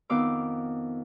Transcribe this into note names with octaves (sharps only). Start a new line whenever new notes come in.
F2 D#3 B3 F5 D6 E6